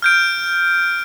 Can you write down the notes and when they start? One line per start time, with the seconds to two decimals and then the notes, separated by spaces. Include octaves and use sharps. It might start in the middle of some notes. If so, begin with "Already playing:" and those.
0.02 F6 G6 D7